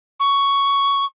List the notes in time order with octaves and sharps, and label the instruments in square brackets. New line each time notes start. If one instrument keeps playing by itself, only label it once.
[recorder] C#6